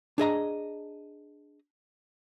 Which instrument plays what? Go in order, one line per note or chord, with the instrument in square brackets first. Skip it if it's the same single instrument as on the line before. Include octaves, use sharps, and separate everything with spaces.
[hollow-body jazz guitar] D4 G#4 D#5 A#5